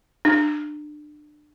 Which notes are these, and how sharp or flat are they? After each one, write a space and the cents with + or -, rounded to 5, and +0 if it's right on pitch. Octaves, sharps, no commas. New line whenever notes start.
D4 +30